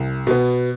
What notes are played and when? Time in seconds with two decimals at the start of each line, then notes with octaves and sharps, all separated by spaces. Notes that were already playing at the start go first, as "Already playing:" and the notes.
Already playing: C2
0.27 B2 B3